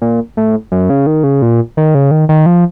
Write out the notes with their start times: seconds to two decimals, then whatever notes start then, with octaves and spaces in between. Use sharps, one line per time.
0.02 A#2
0.37 A2
0.72 F#2
0.90 C#3
1.07 D#3
1.24 C#3
1.42 A#2
1.77 D#3
1.95 C#3
2.11 D#3
2.29 D#3
2.46 F3